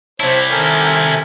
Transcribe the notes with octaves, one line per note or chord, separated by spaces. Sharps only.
C3 E4 C5 C#5 A5
D#3 A4 A#4 G#5